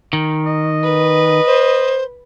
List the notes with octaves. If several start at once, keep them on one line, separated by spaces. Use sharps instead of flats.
D#3
D#5
B4
C5